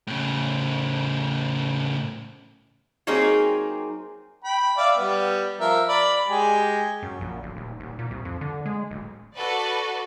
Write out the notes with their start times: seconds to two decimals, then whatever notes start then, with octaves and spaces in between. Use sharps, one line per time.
0.07 A2 C#3
3.07 F#3 A#3 C4 D#4 G#4
4.44 G5 B5
4.77 D5 E5 F5
4.98 G3 B3
5.61 F3 A#4 E5
5.88 D5 B5
6.28 G#3 G4 G#5
7.03 F#2
7.21 A#1
7.43 D1
7.57 D#1
7.80 D#1
7.99 A#2
8.11 C2
8.25 F2
8.41 D3
8.66 G#3
8.91 D1
9.35 F#4 A4 B4 D5